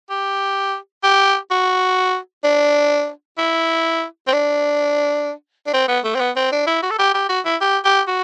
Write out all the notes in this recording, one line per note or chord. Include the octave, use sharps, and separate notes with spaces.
G4
G4
F#4
D4
E4
C4
D4
D4
C4
B3
A3
C4
B3
C4
D4
E4
F#4
A4
G4
G4
F#4
E4
G4
G4
F#4